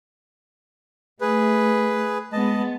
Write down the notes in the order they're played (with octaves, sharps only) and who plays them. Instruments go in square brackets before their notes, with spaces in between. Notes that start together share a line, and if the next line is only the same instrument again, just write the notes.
[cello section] A3 [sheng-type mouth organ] G#4 B4
[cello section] G#3 B3 [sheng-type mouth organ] D#5 A5